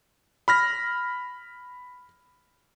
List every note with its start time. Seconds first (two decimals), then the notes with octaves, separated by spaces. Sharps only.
0.48 B5 F6 A#6